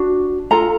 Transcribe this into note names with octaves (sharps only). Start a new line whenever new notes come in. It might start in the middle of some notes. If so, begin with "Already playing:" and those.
Already playing: D4 F#4
F4 A4 A#5